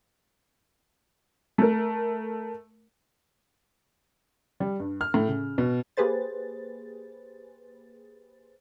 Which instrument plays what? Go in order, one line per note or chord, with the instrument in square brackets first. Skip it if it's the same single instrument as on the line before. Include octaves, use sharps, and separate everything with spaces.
[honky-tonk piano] A3 A#4
[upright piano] G3
G2
F6
A2
C#3
B2
[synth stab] A#3 G4 G#4 B4 C5 A6